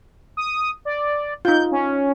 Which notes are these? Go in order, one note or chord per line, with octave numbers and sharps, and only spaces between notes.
D#6
D5
D#4 F4 G6
C#4